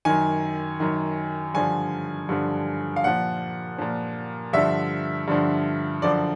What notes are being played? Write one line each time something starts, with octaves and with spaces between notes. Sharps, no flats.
F#2 D#3 G#5
F#2 D#3
G2 D3 F3 G#5
G2 D3 F3
F5
A#2 F3 F#5
A#2 F3
G2 D3 F3 E5
G2 D3 F3
F#2 D3 F3 D5